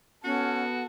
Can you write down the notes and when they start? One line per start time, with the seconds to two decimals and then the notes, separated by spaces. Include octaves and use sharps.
0.24 B3 C#4 F#4 A4